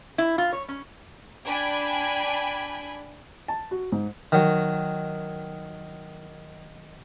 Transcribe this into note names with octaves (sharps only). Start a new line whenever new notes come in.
E4
F4
C#5
C#4
D4 G5 G#5 B5 G#6
A5
F#4
G#2
D#3 F#3